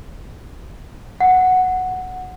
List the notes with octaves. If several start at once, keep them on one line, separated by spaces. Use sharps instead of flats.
F#5